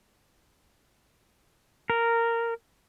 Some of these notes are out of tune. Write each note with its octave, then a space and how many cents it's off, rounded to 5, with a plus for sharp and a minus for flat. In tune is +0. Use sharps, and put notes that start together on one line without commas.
A#4 -10